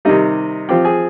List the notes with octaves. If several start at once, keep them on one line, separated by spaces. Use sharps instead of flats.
C3 D#3 G3 D#4 D#5
F3 C4 F4 G4 G5
G#4 G#5